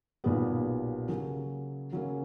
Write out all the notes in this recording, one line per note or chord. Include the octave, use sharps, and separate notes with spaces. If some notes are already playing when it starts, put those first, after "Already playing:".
B1 A#2 G3 B3
C#3 F#3 A#3 C#4
C#3 F#3 A#3 C#4